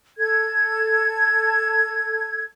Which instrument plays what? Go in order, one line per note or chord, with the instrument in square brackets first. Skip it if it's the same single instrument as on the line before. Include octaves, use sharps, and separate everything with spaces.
[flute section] A4 G#6